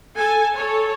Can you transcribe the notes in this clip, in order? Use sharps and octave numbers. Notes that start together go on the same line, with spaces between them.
A4 G#5
A4 C#5